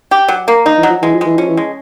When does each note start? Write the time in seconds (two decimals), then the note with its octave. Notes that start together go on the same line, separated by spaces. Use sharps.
0.11 G4
0.28 F#3
0.48 A#3
0.65 D#3 D#4
0.78 E3
0.83 F#3
0.90 F3
1.02 E3 G#3
1.14 F3
1.21 E3 G#3
1.37 F3 C#4
1.49 E3
1.57 G#3